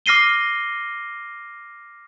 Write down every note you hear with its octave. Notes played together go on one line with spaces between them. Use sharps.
D6 F6 A#6 C7 D#7 G7